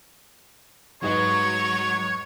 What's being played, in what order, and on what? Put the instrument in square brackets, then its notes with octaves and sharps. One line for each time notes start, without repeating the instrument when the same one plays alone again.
[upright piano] G#2 B4 D#5 [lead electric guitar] F#3 [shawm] C#5 [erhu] C#6